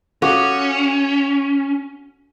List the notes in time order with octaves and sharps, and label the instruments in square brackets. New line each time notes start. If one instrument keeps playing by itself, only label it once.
[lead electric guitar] C#4 [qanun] F#4 [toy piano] A4 F5 D6